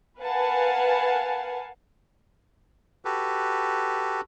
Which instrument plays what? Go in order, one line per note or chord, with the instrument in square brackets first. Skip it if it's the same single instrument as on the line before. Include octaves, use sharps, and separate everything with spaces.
[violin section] A#4 B4 F5 F#5 G#5 A5
[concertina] F#4 G4 A4 B4